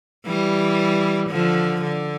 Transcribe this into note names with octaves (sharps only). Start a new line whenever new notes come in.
E3 G3
D3 F3
D3